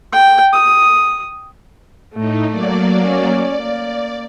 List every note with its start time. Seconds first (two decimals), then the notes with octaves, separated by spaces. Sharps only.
0.12 G5
0.53 D#6
2.14 A2 A3 D#4
2.49 F#3 A#3 D5
3.03 C#4
3.34 D5
3.62 A#3